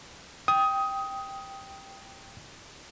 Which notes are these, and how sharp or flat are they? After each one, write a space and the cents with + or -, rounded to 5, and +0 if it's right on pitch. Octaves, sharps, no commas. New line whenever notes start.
G5 +0 D#6 +15